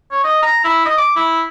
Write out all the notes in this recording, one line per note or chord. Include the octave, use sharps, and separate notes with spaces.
C#5
D#5
A#5
E4
D#5
D6
E4